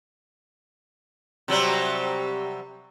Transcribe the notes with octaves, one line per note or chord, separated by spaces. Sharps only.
C3 F#3 G3